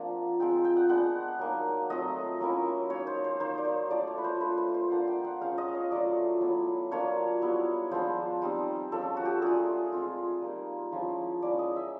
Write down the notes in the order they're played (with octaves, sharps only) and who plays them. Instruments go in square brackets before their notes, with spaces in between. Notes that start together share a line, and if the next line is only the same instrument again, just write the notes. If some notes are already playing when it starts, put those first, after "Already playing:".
Already playing: [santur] F3 A#3 C4 D4 F#5
G#3 C4 F4 G5
G5
F#5
G#3 B3 D4 F#5
F#3 A#3 D#4
F#3 A3 C4 F4 D#5
F#3 A#3 C#4 E4
A#3 D#4 C#5
C5
C5
A#3 D#4 C5
D5
C#5
A3 D4 F4 D5
C#5
B4
C5
A3 D4 F4 B4
C5
C5
A#3 D4 F4 F#5
G5
F#5
G#3 C#4 F4 F5
D#5
C#5
F#3 A3 D4 F4 D5
F#3 B3 E4
F#3 A#3 D4 F4 C#5
G3 B3 E4
F3 G#3 B3 D4 C5
G3 C4 D#4
F3 G#3 C#4 A4
F#4
G4
A3 D4 F4 G#4
G#3 C4 F4
G3 A#3 D#4
F3 G#3 C#4 E4
G#3 C#4 E4 D5
D#5
E5